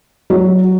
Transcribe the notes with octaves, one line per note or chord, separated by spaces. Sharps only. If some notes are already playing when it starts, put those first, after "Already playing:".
F#3